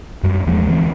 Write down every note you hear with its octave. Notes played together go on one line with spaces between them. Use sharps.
F#2 G3
E2 F3 G#3 A3
D2 E3 C4